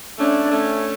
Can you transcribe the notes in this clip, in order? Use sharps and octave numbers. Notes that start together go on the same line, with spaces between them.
A3 C#4 D4
A3 C#4